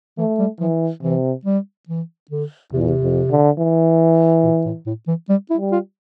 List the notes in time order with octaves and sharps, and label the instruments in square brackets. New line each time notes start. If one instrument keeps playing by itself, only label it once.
[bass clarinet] E3 [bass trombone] A3
[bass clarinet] G3
[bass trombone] E3 [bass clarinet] F3
[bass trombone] C3 [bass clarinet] E3
[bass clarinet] G3
E3
D3
[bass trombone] E2 [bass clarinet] C3
[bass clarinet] A#2
C3
[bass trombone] F2
D3
E3
[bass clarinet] A#2
A2
A2
E3
G3
E4
[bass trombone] G3
[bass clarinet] F4